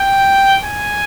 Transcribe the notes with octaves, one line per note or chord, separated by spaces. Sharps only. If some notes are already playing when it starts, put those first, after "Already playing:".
Already playing: G5
G#5